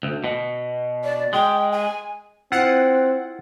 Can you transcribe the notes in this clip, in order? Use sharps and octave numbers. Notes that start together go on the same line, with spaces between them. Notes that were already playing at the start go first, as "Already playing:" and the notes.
D2
B2
D5
G#3 G5
G#5
C4 E4 F4 F#5